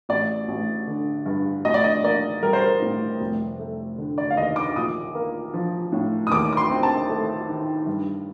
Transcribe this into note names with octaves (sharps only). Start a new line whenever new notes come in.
A1 D5
A1
D3
G2
A1 D#5
D5
D#5
A#3 D5
G3 A#4
C5
A#4
A2
F1
A3
D3
D5
F5
D#2 D#5
D6
A#1 D#6
A#3
F3
A2
D#6
D#2 D6
D6
C6
C4
A5
A3
D#3
G2